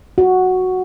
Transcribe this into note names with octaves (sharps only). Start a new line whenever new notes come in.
F#4